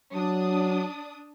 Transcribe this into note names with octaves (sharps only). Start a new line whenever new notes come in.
F#3 D4 D#6